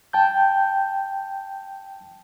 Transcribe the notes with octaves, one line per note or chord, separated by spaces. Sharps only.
G5 A5 G6